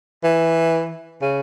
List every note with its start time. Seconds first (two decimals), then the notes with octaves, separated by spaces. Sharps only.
0.24 E3
1.22 C#3